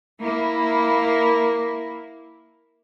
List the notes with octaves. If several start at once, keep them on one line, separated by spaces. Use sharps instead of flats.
A#3 E4